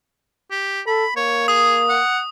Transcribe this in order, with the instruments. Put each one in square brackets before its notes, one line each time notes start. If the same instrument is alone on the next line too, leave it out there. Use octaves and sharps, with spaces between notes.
[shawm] G4
[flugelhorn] A4 [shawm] B5
[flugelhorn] A#3 [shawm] C#5
[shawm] G#4 [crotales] D#6
[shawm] F#5